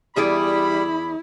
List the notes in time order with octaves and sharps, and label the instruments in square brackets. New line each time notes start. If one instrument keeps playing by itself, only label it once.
[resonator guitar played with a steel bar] E2 G#4 D5 [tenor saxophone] G3 [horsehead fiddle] E4 [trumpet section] B5